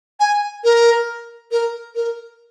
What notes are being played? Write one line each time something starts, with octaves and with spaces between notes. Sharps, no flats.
G#5
A#4
A#4
A#4